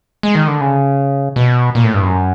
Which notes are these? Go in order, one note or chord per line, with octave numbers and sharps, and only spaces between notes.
G#3
D#3
D3
C#3
B2
A#2
A2
G2
F#2